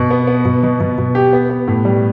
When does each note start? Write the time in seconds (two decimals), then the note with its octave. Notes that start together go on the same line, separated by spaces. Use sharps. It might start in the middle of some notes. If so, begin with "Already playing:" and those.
Already playing: B2
0.11 B3
0.27 B3
0.45 B2
0.63 B2
0.80 B2
0.98 B2
1.15 G4
1.33 B3
1.49 B3
1.68 A2
1.85 G3